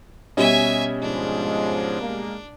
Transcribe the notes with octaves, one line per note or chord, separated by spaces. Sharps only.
B2 G3 C#4 D#5 E5 G#5
G#2 F3 G#3 D4
G#3 A#3